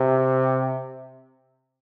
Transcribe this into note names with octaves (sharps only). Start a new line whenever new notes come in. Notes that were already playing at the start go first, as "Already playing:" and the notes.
Already playing: C3